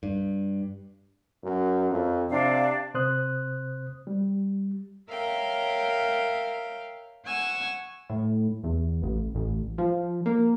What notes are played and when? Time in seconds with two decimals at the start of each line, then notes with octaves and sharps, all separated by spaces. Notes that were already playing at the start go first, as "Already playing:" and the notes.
0.03 G2
1.43 F#2
1.91 F2
2.30 C3 D4 F5
2.94 C3 C5 D#6 F#6
4.07 G3
5.10 A#4 C#5 E5 F5 G5
7.26 F#5 G#5 C#6 E6
8.10 A2
8.64 E2
9.02 A1
9.35 A1
9.78 F3
10.26 A#3